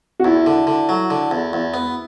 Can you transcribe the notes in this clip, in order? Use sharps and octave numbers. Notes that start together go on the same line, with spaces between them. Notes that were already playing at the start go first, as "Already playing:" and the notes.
F#4
E2 E4
D3
D3
F#3
D3
E2
E2
B3